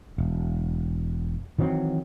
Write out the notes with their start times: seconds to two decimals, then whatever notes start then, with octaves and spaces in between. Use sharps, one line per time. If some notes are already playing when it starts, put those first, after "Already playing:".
0.18 E1
1.59 D#3 E3 F#3 C4